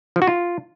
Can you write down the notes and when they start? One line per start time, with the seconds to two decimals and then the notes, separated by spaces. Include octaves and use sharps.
0.16 F3
0.22 F#4
0.27 F4